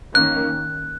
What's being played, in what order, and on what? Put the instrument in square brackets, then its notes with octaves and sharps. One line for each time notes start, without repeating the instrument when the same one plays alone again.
[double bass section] D#3 A#3 C#4 [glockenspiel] F#6